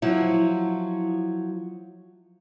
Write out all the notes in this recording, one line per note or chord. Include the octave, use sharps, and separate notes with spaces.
F3 F#3 E4